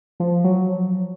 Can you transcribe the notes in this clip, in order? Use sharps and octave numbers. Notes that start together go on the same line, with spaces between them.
F3
F#3